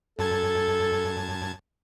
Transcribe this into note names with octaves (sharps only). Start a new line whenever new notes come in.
F#2 A4 A5 G#6